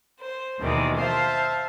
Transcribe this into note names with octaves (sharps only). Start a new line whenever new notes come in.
C5
D#2 B2 D#3 E3 G#3 D5
C5 E5 F5 A5